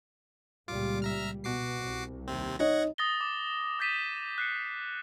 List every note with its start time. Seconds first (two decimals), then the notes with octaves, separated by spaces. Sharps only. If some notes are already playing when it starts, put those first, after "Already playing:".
0.68 C#2 A#2 G3 F4 D6
1.02 E5 A#5 F6
1.44 B2 F#4 D6 C7
1.79 C2
2.27 D#2 C3 C4
2.59 D#4 C#5 D#5 F#5 G#6 A#6
2.98 D#6 A6 A#6 G7
3.21 D6
3.79 D#6 G6 A6 B6 D#7 E7
4.38 F#6 C7 C#7